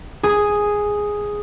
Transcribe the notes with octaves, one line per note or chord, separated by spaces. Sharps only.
G#4